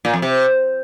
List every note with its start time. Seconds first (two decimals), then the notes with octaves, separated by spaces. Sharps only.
0.05 A#2
0.14 F2
0.22 C3